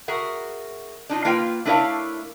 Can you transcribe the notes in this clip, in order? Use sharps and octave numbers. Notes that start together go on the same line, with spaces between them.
F#4 G#4 A#4 E5 F#5
D4 D#4 F4
A#3 F4 B4 G5
A3 D4 E4 A#4 C#5 F5